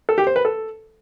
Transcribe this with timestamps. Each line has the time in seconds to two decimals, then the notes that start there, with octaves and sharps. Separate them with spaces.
0.09 A4
0.18 G4
0.27 C5
0.36 B4
0.45 A4